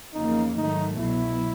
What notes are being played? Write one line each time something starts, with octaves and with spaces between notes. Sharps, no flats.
E2 C#3 F3 A#3 D#4
G#2 D#3 F#3 A3 D#4
C2 B2 F#3 E4